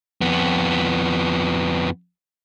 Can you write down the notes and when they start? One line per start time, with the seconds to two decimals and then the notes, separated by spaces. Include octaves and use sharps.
0.21 F2 B3